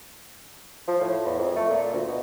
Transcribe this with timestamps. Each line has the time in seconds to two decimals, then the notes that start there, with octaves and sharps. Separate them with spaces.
0.88 F3
1.01 A2
1.25 E2
1.39 F2
1.56 A3
1.70 A#2
1.93 D2
2.08 B2